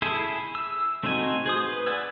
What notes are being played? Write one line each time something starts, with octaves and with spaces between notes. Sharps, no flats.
E4 G#4 A4
E6
A3 C4 D#4 F#4 G#5
G#4 C5 D#6
B4
B4 D5 F#5 G#5 E6